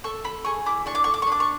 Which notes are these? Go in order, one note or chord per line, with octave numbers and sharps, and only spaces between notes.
A4 C#6
A4 B5
G#4 C#6
E4 D6
D4 C#6
D6
A4 C#6
D6
C#6
D4
D6
C#6